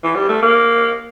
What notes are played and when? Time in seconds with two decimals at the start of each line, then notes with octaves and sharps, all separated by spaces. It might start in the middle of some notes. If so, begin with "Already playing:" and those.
0.04 E3
0.15 G3
0.29 A3
0.42 A#3